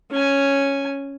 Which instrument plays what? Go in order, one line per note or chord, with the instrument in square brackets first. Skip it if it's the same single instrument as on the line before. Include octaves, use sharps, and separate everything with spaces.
[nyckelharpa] C#4 G#5